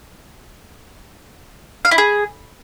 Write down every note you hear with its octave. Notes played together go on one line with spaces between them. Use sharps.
F5
E4
G#4